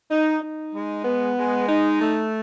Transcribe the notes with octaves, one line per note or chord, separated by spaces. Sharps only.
D#4
D#4
G#3
B3
G#3
D#4
A3